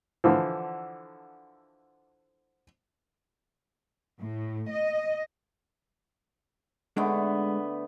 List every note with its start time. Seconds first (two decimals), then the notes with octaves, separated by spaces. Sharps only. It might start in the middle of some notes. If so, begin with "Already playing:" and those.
0.24 D3 E3 F3
4.20 A2
4.71 D#5
6.97 D3 G#3 A3 B3 D4 D#4